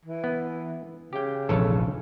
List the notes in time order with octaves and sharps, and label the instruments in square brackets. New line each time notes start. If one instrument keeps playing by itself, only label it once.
[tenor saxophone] E3
[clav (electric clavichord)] B3
[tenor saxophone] C#3 [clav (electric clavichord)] G4 G5
[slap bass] F1 A#1 E3 [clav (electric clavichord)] A4 C#5 A5